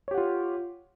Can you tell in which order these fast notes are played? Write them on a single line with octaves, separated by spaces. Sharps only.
C#5 G4 F#5 F4